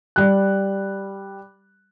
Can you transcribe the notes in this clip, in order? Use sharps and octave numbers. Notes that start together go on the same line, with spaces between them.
G3 F#6